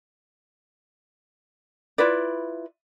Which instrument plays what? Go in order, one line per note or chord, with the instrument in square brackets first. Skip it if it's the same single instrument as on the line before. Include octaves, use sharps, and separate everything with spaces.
[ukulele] E4 F4 B4 D5